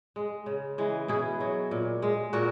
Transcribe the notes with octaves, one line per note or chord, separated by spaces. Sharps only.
G#3
C#3
E3 G#3
B2 E4 G#4
F#3
A#2
G#3
A#2 F#4 A#4